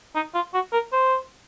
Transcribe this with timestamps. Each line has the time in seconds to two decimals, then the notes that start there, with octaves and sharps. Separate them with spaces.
0.15 D#4
0.35 F4
0.54 F#4
0.73 A#4
0.92 C5